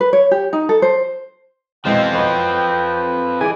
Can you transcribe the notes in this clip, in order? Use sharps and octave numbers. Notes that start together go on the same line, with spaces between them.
B4
C#5
G4
D#4
A4
C5
B2 E3 F3 G#3 C4 G5
F#3 B4 C5 D#5
E3 G#4 D5 D#5 G#5